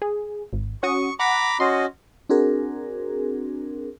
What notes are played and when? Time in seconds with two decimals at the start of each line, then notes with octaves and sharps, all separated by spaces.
0.02 G#4
0.53 G#1
0.83 C#4 F#4 C#6 D#6
1.19 F#5 A#5 B5 D6
1.60 C#4 F#4 D#5 C6
2.30 C4 D4 F#4 G#4 A#4